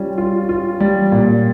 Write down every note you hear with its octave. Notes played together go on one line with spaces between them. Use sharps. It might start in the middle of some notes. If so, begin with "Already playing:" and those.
Already playing: G3 C#4 F4
F4
F4
G3
A#2